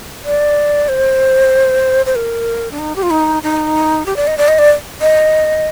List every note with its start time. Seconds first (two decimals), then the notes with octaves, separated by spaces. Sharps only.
0.25 D5
0.89 C5
2.06 C5
2.15 A#4
2.71 D4
2.79 D#4
2.96 G4
3.03 F4
3.10 D#4
3.43 D#4
4.06 G4
4.16 D5
4.27 D#5
4.38 D5
4.48 D#5
4.59 D5
5.01 D#5